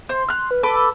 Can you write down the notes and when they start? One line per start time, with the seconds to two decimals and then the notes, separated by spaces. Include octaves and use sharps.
0.09 C5 C6
0.29 F6 F#6
0.51 B4
0.63 A4 B4 A5 D6
0.76 E6